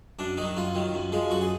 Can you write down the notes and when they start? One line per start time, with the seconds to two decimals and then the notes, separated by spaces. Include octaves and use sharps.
0.19 F#2 D4
0.37 D#3 F#3 D#4
0.57 F#2 F4
0.75 D#3 F#3
0.94 F#2
1.12 F3 G#3
1.31 F#2 F#4
1.41 G#4